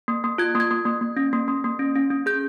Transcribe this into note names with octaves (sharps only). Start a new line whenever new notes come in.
A#3
A#3
F4 G#6
A#3
G#6
A#3
A#3
A#3
C#4
A#3
A#3
A#3
C#4
C#4
C#4
G#4 G6